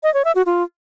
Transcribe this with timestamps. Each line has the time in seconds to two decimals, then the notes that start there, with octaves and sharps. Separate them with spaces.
0.03 D#5
0.14 C#5
0.24 E5
0.35 F#4
0.46 F4